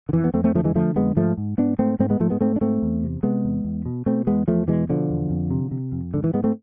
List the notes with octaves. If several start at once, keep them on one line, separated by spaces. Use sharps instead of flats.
D3
F2 E3
B3
F2 A3 C4
A3 C4
D3 F3 A3
E3 G#3
D3 F3 A3
F2 G#3 B3
G#2 F3 A3
G#2
G#2 B3 D4
G#2 A3 C4
G#2 A3 C4
G#3 B3
G#2 F3 A3
G#3 B3
G#2 A3 C4
D4
G#2 A3 C4
E2
C3
C3 G#3 B3
E2
E2
B2
B2 A3 C4
E2 G#3 B3
E2 F3 A3
B2 E3 G#3
B2 D3 F3
E2
F2
C3
C3
F2
G#2 D3
E3
G#2 G#3 B3
A3 C4